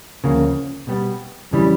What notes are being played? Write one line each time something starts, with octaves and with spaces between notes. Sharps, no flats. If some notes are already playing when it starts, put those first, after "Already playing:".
D2 C#3 F3 A#3
B2 G3 B3
F2 C#3 E3 G3